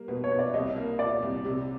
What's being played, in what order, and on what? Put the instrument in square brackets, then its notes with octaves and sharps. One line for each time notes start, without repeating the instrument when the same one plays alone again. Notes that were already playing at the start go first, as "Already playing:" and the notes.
Already playing: [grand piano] G3 A#3
[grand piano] B2 [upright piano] B4
[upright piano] C#5
[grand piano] B2
[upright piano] D5
[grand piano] C2 [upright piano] D#5
[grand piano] A#3
[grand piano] A#2 [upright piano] D5
[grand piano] C2
C3